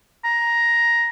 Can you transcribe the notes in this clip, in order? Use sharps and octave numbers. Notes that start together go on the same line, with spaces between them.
A#5